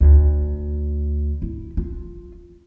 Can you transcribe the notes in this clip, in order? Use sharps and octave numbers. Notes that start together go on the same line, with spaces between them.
D2
E4
F4